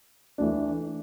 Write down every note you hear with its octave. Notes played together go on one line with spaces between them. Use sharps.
E3 A3 D4